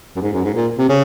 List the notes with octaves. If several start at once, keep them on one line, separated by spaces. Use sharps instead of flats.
F#2
G#2
F#2
G#2
A#2
C3
C#3